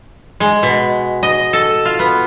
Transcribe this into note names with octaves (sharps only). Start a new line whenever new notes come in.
G#3
B2
D#5
A4
F4
B3